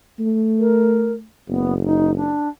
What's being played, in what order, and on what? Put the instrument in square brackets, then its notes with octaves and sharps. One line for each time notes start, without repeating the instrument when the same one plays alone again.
[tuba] A3
[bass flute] A#4
[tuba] F#1 [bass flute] B3
[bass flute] D#4
D4